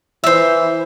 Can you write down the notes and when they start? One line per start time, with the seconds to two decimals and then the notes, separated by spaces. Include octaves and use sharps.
0.24 E3 C5 E5